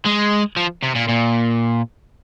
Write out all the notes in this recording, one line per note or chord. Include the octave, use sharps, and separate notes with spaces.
G#3
F3
C3
A#2
A#2